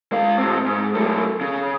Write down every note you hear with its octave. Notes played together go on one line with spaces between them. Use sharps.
G#3 F5
A2 C4
G#2
F#2 A3
C#3